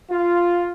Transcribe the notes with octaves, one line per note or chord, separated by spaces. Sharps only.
F4